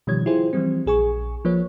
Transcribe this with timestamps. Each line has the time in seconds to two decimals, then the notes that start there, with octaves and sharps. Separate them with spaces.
0.07 B2 D#3 F3 G3 C#5 G#6
0.26 E4 F4 G4 G#4 C5
0.53 E3 F3 G3 C4
0.86 A#1 G#4 G#5 C#6
1.45 F3 A#3 B4 C#5